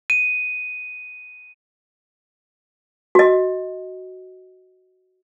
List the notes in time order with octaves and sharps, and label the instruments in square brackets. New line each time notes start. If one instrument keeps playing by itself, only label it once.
[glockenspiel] D#7
[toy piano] F#4 D#5